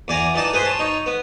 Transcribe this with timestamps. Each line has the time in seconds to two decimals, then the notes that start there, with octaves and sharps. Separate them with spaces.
0.08 E2 D5 G#5 A#5
0.34 E3 D#4 D5 A5
0.53 G#4 B4 C5
0.65 C#5 A5
0.79 D#4 C#5
1.06 B3